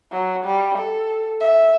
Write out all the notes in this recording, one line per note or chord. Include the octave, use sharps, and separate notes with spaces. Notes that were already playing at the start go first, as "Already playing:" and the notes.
F#3
G3
A4
E5